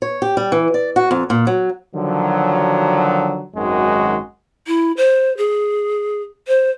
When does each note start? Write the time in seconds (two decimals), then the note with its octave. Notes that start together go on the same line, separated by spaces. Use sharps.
0.02 C#5
0.22 G4
0.37 G3
0.52 E3
0.74 D5
0.96 F#4
1.11 F2
1.30 A#2
1.47 F#3
1.95 D3 D#3 F3 F#3
3.55 G#1 F#2 D#3 G#3 F#4
4.67 E4
4.97 C5
5.37 G#4
6.48 C5